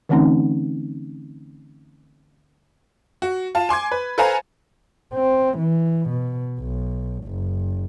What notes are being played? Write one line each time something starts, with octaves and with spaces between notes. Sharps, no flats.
D3 E3 A3 C4 C#4 D#4
F#4
F4 A5
G#5 C6 D6 G#6
B4
A4 B4 C5 F5 G#5 A#5
C4
E3
B2
B1
F#1